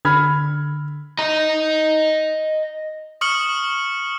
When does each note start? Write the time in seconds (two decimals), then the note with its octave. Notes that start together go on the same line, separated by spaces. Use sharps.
0.05 D3 B5 F6 G#6
1.19 D#5 A#5
3.21 C#6 D#6 F6 C#7 F#7 G7